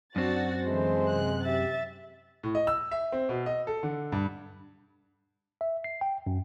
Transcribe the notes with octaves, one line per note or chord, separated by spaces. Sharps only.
F#2 C4 D4 F#4 A6
D3 E3 G#3 A3 C5
C3 F#6
G4 E5 A6
A2
D#5
E6
E5
C4
B2
D#5
A4
D3
G2
E5
C7
G5
F#2